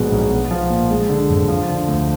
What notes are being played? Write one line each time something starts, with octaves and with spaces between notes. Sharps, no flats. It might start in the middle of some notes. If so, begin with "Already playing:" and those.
Already playing: A#1 B2 G#3
B1
B3
F3
A#2
G#3
D3
F2
F3
D3
D2